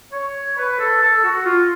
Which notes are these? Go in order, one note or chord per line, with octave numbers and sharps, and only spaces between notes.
C#5
B4
A4
A4
F#4
F4